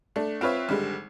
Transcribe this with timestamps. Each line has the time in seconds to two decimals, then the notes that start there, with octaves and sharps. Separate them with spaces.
0.16 A3 D4
0.41 C4 F4 B4 C#5 E5
0.69 G#1 D3 G3 G#3